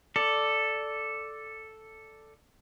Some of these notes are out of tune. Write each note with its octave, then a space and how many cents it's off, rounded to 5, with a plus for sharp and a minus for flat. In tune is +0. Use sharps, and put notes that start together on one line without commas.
A4 +0 D5 +0